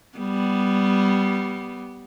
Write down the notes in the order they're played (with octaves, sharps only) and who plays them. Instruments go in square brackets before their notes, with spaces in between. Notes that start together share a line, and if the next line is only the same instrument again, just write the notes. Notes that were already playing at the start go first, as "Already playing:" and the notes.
[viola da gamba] G3 B3